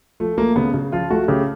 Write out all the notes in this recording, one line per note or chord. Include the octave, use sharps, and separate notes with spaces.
F3 A3
A3 A#3
C#3 B3
C#3
F3 F4
A3 F#4
C#3 G4